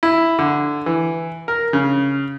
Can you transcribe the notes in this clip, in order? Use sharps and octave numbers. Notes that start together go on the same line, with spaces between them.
E4
D3
E3
A#4
C#3